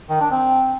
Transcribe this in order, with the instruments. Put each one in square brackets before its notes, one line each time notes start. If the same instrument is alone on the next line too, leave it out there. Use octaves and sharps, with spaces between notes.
[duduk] D#3
D4
C4